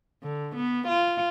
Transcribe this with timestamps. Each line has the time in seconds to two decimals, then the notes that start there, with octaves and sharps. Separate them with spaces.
0.23 D3
0.56 B3
0.88 F4